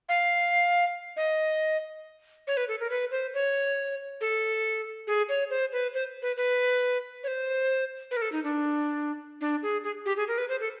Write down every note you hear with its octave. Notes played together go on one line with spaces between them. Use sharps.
F5
D#5
C#5
B4
A4
A#4
B4
C5
C#5
A4
G#4
C#5
C5
B4
C5
B4
B4
C#5
C5
B4
A#4
A4
D#4
D4
D4
G#4
G#4
G4
G#4
A#4
B4
C5
A4